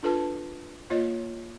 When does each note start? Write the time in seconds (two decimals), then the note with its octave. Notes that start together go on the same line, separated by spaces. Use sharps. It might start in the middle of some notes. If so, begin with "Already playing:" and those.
0.03 D4 F4 A4 B4 A5
0.90 A#3 F4 C#5 D#5